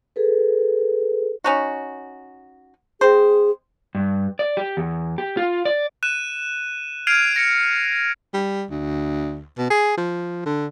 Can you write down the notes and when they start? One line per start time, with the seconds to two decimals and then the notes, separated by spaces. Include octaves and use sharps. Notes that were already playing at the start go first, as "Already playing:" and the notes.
0.16 G#4 A4 B4
1.44 C#4 D#4 F#4
3.01 C4 G#4 C5
3.95 G2
4.39 D5
4.57 G4
4.77 E2
5.18 G4
5.37 F4
5.65 D5
6.03 F#6 D#7 E7
7.07 F6 G#6 C7 D7 D#7 F7
7.36 A#6 C#7
8.34 G3
8.70 D2
9.58 B2
9.70 G#4
9.97 F3
10.45 D3